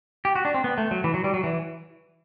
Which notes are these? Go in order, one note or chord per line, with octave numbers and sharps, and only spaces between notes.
G4
F#4
D4
C4
B3
A3
F#3
E3
F#3
G3
F#3
E3